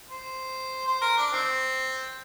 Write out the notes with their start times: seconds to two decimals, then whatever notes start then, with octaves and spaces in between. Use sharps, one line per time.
0.09 C5
0.86 C5
1.01 A#4
1.17 D4
1.32 D#3 C4